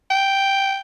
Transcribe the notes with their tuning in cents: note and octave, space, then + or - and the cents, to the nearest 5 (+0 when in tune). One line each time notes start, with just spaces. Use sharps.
G5 +0